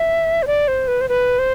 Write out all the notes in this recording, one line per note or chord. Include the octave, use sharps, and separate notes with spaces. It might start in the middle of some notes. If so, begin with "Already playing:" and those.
Already playing: E5
C5
D5
C5
B4
C5
B4
C5